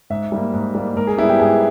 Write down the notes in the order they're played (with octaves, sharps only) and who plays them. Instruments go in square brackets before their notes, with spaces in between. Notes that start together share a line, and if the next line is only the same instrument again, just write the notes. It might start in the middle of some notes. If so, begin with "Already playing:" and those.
[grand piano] G#2 E5
G3 A#3
G#2
G3 A#3
G#2 A#4
G#4
G3 B3 E4
G4
G#2 G#4